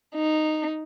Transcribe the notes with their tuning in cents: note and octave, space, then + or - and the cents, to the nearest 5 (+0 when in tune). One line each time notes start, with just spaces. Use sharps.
D#4 -10